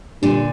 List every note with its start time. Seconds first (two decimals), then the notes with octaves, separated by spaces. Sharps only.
0.22 G2 A#2 D3